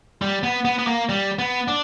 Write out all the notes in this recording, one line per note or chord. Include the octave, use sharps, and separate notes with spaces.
G3
B3
B3
B3
A#3
G3
B3
D4